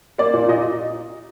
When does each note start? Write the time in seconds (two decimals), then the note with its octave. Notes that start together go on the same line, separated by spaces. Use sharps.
0.18 A#3 D5
0.33 A#2 D5
0.48 A#2 D#5